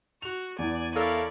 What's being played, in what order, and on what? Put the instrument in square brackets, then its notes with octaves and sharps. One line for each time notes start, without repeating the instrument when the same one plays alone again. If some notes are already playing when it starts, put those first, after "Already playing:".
[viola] F#4 [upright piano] F7
[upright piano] E2 E3 [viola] D5 G#5
[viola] E4 D5 [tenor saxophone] A4 [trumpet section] A#4 C#5 F5